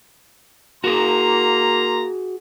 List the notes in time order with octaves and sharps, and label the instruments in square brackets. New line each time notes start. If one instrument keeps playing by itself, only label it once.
[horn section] A#3 A#5 C6 [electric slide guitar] F#4 G#4